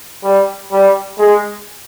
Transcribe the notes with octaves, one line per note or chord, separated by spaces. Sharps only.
G3
G3
G#3